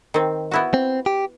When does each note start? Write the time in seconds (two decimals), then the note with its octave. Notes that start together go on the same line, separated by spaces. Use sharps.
0.14 D#3 C4
0.51 B3 E4 F#4
0.74 C4
1.06 G4